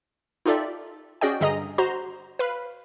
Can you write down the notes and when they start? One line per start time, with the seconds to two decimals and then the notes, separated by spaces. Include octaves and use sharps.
0.46 D#4 F4 G4 A4 D5 E5
1.21 C#4 F#4 G#4 D5 D#5 G5
1.41 G2 D3 G#4 D#5 A#5 D#6
1.78 F#4 C5 A#5 C6
2.39 B4 F5 B5